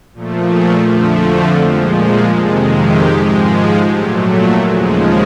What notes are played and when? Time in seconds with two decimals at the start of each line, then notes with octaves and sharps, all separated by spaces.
0.13 A#2 F3 A3
0.51 G#4
0.89 F2 D3 F3 A3
1.27 F#4
1.64 A#2 F3 G#3 G4
2.02 G#4
2.40 F2 C3 D#3 G#3 A4
2.79 G4
3.17 G#2 F3 G#3
3.92 A#2 F#3 A3 G4
4.68 D#2 C#3 F3 G#3 F#4